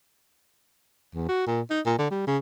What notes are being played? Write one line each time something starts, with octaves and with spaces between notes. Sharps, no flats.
E2
F#4
A#2
D#4
A#2
D3
G3
C#3